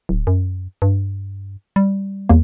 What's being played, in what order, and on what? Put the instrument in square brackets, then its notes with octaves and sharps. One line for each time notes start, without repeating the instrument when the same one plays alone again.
[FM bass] D1
F#2
G2
G3
[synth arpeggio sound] E2 A#3